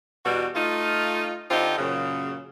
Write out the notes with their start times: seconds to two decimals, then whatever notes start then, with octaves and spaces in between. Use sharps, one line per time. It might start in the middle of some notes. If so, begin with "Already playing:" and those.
0.26 E2 B2 G3 F#4
0.55 A3 D#4 F4
1.51 D3 C4 D#4 F4 G4
1.77 F#2 A#2 C#3